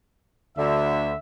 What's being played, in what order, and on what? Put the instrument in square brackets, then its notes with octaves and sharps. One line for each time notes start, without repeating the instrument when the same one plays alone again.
[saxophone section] D2 D3 [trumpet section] E5